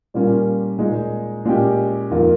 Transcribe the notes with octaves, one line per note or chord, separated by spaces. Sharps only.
A#2 G3 A#3 C#4 F4
A#2 G#3 D#4 G#4
A#2 G#3 C#4 G4
F2 D#3 A#3 F4